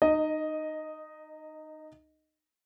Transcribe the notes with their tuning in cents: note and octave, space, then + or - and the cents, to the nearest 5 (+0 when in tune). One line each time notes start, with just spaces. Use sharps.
D#4 -20 D#5 +0